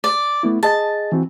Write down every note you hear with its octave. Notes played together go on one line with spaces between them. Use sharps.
D5
A3 B3 E4
G#4 D#5 A5 A6
E3 C4 F#4